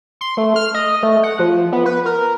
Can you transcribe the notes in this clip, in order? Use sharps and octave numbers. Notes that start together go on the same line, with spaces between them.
C6
A3
F6
D#5
A3
F#5
F3
B3
B4
A#4